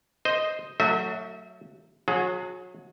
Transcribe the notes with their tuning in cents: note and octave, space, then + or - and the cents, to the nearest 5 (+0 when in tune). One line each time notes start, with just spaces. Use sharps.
C5 +0 D#5 +0
F#3 +0 A3 +25 E5 -35
F#3 -30 G#4 +20